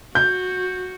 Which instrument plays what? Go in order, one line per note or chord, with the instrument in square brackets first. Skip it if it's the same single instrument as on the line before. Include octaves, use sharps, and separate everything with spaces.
[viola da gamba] F#4 [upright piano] G6